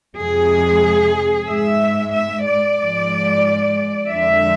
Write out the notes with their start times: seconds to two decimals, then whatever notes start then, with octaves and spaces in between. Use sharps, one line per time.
0.17 F2 C3 G#3 G#4
1.47 G#2 G#3 E5
2.13 E5
2.45 D5
2.78 G#2 F3 G#3
4.08 F2 D3 G#3 E5